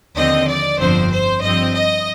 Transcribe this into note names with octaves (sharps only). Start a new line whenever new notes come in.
D#2 D3 F3 C4 D#5
D5
G1 F2 D3 F3 C4 C5
C5
G2 F3 C4 D#5
D#5